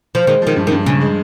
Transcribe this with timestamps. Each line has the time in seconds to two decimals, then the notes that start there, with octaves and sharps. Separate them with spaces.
0.15 F3
0.27 D#3 G#3
0.42 D#3 F3
0.56 G2
0.67 D#3
0.72 G2
0.86 G2 C#3
1.01 G#3